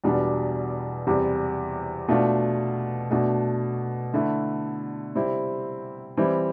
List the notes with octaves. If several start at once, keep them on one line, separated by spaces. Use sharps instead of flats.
E2 B2 G3 D4
E2 C3 G3
B2 A3 D4 F4
B2 A3 D4
D3 A3 E4
C3 G3 C4 E4
E3 G3 C4 E4